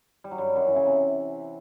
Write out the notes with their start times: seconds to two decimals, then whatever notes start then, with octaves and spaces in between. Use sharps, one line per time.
0.24 G3
0.31 F#3
0.38 G2 G3
0.55 F#2 F#3
0.66 E3
0.76 C#3
0.86 C3